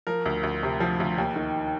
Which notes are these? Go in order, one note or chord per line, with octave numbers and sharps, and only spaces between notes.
F3 A#4
D2
D2
C3
F3
D2
D#2
D#3